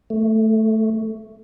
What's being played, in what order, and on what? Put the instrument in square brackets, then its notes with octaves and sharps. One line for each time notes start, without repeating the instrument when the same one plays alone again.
[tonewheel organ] A3